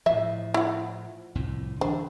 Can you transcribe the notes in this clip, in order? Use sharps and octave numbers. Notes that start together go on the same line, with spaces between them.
A2 F3 E5
E4 F#5
C2 F2 A2
D3 E3 D4 C5